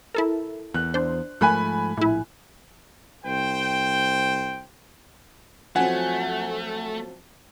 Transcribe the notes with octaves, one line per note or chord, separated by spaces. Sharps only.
E4 A4 A#4
E2 F#6
D4 C5
G#2 F3 A3 G#5 B5 F#6
A#1 A2 E4
C2 C5 G5
F3 F#3 A3 C4 F#5 G#5